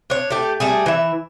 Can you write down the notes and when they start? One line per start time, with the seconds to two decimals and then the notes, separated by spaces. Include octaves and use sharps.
0.10 D4 C#5
0.30 A3 G4
0.60 G3 A3 G#4
0.86 E3 E5